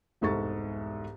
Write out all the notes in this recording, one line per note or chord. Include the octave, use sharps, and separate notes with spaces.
E1 C2 G#2 A4 C#6 A6